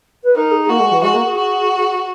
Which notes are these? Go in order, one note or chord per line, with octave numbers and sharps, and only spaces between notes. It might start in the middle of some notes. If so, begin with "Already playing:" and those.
B4
D#4 A#4
G#4
A#3 F#4
G#3
E3
G#3 F#4
A#3
G#4
F#4